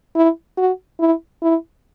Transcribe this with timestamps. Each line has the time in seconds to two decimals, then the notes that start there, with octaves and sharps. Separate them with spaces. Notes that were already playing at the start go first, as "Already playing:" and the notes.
0.16 E4
0.58 F#4
1.00 E4
1.42 E4